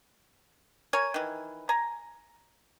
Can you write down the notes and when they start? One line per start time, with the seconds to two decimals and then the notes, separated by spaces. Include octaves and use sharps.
0.93 A#4 C#5 G#5
1.14 D#3 E3
1.69 G#5 A#5